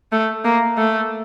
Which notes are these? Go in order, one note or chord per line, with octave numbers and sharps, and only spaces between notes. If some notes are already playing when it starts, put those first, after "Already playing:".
A3
A#3
A3